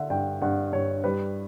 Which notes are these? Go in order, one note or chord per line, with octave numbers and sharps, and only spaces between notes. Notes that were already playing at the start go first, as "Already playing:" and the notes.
Already playing: D3 E5 F#5
G2 G5
G2 F#5
G2 C#5
G3 B4